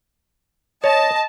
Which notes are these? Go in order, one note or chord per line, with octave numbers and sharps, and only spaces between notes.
C#5 D#5 A5